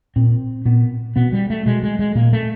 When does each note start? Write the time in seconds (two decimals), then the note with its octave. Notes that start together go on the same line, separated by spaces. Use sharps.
0.16 A#2 C4
0.65 A#2 B3
1.16 B2 B3
1.32 G3
1.50 A3
1.66 B2 G#3
1.83 G#3
1.99 G#3
2.15 A#2 A#3
2.33 A3